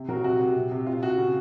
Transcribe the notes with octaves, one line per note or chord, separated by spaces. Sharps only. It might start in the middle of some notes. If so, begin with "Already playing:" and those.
Already playing: C3
F#3 F#4 A#4
C3 F#4
C3
C3
C3
C3 F4
C3 F#4
C#3